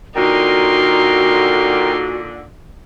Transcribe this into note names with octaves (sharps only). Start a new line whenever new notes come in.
A#2 D3 D#4 F#4 A#4 G5 C6